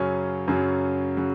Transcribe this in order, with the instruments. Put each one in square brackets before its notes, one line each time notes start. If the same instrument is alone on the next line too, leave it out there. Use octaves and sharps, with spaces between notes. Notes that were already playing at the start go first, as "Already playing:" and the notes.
Already playing: [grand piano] F#2 C#3 F#3 C#4
F#2 C#3 F#3
C#3 F#3